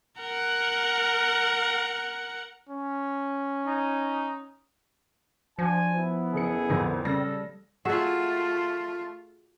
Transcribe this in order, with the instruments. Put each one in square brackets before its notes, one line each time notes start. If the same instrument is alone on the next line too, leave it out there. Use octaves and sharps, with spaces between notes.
[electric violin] A#4 F#5
[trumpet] C#4
[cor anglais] D#4
[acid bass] F3 [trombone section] D4 F#4 C5 [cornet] G#5
[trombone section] B3 E4
[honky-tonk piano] F#1 A4 C#7 [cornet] G#4
[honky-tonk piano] F2 A#2 [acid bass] D3
[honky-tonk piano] C#3 A#6 [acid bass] G3 [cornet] A4
[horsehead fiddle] A3 F4 [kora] F#4 G#4 E5